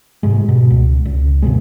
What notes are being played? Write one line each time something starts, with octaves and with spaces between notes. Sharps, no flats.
G#2 C3 G#3
B2
C#2
C#2
F#1 D2 B2 G#3